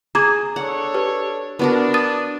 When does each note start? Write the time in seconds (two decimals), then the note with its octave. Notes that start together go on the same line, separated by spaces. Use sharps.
0.15 G#4 A#5 D6 G#6
0.56 D4 A4 C#5 F#5
0.95 G4 B4
1.59 B3 D4 F#4 A#4
1.94 D#6 A6 D#7